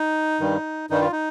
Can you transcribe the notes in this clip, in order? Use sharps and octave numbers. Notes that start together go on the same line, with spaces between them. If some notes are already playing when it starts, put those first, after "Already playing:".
Already playing: D#4
G2 D#3 G3
G2 D#3 G3 D#4
F4
D#4